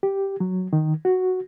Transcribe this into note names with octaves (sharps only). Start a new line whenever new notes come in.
G4
F#3
D#3
F#4